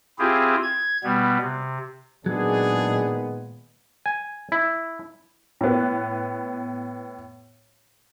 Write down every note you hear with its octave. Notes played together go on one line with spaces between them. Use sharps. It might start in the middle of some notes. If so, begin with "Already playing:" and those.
C4 E4 F4 G4 G#4
G#6
B2 G3 B3
C3
A#2 D#3 F#3 G#3 B3 D4 G#4
G#5
E4
A2 B3